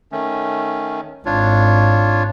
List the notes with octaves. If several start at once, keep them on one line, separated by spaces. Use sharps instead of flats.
D#3 A3 C#4
G#1 D4 F4 C#5